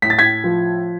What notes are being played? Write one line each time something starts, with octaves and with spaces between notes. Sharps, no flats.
A2 B6
A6
G#6 B6
F3